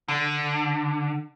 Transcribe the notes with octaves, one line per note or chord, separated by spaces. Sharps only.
D3